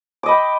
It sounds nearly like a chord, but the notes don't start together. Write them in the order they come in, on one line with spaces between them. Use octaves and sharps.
D6 D#5 B5 G5